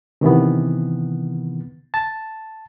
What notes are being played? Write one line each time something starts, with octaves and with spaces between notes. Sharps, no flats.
C3 D#3 E3 B3
A5